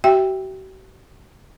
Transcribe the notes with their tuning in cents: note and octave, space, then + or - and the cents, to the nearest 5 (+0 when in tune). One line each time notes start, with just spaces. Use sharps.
F#4 +45 E5 +0 G5 +10